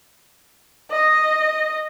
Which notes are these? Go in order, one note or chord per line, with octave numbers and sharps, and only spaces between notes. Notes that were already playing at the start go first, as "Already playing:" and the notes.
D#5